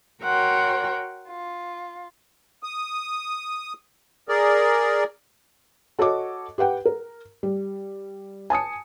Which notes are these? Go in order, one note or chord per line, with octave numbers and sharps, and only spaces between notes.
F#4 A#4 C#5 F#5 G5 C6
F4
D#6
G#4 A#4 D5
F#4 A4 C#5 D#5 D6
G4 B4 F#5 G5
A#4
G3
G#5 A5 D#6 C#7